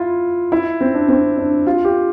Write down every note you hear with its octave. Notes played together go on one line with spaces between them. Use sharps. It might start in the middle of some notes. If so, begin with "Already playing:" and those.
Already playing: E4 F4
E4
C4
D4
C4
D4
F4
G4